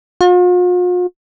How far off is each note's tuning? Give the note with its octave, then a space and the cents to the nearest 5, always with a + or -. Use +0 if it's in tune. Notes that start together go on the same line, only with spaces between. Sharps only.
F4 +45